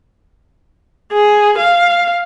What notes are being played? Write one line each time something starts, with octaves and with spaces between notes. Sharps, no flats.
G#4
F5